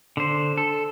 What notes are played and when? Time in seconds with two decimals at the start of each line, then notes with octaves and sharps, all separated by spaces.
0.17 D3 C5
0.57 A4